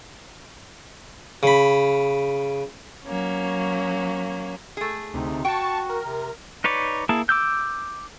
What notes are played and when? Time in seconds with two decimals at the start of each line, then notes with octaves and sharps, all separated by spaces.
1.43 C#3 B5
3.05 F#3 A#3 C#4
4.77 A3 G#4
5.14 D2 C3 D#4
5.45 F#4 G5 A5 C#6
5.89 A#4
6.04 C3
6.64 D#4 B4 C#5 D5
7.09 A#3 E4 G#4 A5
7.29 D6 E6 G6